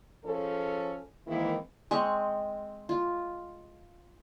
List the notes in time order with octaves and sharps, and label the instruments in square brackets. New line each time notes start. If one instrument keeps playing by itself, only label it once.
[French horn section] F3 C#4 G#4 A4
D#3 E3 G#3 A#3 C4 E4
[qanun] G#3 C4 C#6
F4